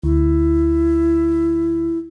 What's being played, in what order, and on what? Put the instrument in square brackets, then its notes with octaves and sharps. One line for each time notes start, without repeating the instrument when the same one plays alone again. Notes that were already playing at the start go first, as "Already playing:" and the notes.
[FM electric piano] D2 [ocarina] E4